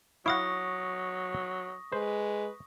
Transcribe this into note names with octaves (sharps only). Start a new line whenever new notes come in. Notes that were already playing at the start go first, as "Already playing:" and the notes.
F#3 E4 F5 F#5 C#6 D#6 A#6
G#3 B4 C5